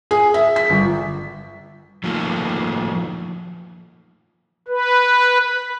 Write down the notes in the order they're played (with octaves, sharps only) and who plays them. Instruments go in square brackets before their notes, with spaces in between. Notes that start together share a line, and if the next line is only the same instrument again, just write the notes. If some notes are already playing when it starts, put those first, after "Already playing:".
[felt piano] G#4
E5
B6
G1
[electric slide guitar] D#3 F3 A3 A#3
[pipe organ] B4